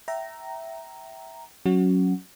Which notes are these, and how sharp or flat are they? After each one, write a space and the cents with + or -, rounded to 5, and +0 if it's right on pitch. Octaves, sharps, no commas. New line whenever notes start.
E5 +0 G5 -30 A#5 +0
F#3 +0 C#4 +0 F#4 +0